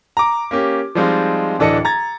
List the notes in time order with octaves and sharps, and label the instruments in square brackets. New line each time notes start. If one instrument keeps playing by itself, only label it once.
[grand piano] A#5 D6
A#3 C#4 G4
F3 G3 G#3 C4 D#4 F4
D1 E3 D4 A4 D#5 C#7
A#5 G#6 A6